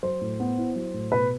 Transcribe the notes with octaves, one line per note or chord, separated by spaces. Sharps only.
F#3 C5
A2
B3
E4
F#3
A2
B2 B4